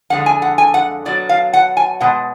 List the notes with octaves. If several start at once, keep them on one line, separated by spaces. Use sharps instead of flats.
F2 D3 G#3 F#5
G#5
F#5
G#5
F#5
B2 F#3 D5
F5
F#5
G#5
B2 G#3 F#5